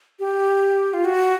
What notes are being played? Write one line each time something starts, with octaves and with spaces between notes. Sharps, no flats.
G4
F4
F#4